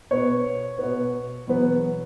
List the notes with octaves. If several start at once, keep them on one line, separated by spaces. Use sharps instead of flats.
B2 B3 C#5
B2 B3
E2 B2 F#3 B3